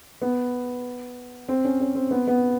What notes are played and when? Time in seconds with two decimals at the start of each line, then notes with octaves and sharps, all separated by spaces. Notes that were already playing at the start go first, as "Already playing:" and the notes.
0.22 B3
1.49 C4
1.65 C#4
1.80 C#4
1.95 C4
2.11 B3
2.28 B3